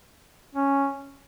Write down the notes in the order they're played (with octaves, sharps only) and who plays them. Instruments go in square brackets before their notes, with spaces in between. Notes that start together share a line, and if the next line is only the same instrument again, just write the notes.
[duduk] C#4